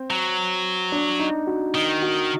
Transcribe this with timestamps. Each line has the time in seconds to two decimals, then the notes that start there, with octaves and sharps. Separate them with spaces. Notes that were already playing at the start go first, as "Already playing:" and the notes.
Already playing: C4
0.10 F#3
0.92 D4
1.19 D#4
1.47 F#4
1.75 D#3 D#4
2.02 F#4